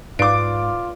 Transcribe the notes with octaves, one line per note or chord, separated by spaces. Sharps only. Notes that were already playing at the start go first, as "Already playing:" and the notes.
G#2 F4 B4 D5 F5 D6 D7